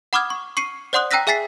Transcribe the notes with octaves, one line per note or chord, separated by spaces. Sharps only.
F#5 B5 D6 D#6 F6 G#6
C#6
C#6 C7 C#7 D#7
C5 D5 F#5 C6 D#6 F#6
G5 A#5 E6 F#6 A#6 B6
G#4 E5 G#5 A6 B6 C7